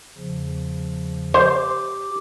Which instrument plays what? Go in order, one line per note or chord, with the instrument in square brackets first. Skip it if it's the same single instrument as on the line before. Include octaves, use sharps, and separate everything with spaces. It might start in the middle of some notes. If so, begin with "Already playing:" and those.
[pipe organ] E2 C#3 F3
[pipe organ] G4 D6 [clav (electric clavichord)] C5